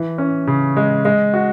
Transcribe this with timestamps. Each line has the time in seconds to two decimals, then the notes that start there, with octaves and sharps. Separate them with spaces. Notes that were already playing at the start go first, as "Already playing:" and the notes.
Already playing: E3
0.18 C#4
0.47 C#3
0.77 G#3
1.05 G#3
1.34 F#4